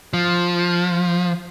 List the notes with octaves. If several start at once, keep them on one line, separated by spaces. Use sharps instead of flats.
F3